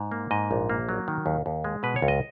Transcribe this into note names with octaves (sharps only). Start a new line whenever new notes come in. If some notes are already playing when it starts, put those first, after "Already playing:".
Already playing: G#2
A#3
G#2 D#5
A#1
A#3
F#3
D#3
D#2
D#2
G#3
B2 B4
C#5
C#2
D#5